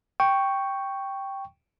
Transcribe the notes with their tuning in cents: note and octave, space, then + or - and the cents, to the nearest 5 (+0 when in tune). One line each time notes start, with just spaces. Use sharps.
G5 +0 C#6 +0